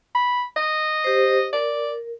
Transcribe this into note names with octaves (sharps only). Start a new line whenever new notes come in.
B5
D#5
G4 C5
A#4 D5